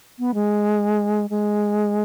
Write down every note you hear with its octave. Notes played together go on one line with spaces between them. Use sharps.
B3
G#3
G#3